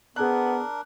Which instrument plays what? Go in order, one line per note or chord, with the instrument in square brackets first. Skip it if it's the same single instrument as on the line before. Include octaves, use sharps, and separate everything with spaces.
[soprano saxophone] B3 [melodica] D4 A#4 [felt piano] G#4 F#6